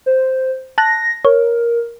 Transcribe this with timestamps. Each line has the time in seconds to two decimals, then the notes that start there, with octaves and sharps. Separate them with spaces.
0.06 C5
0.78 A5 F#6 A#6
1.25 A#4 C#5